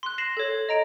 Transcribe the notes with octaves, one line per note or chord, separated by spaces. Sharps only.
C6 F#6
A#6 C7 E7 F#7
A4 C#5
D#5 A#5 D7